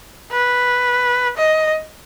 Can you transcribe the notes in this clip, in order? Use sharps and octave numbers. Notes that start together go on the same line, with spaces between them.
B4
D#5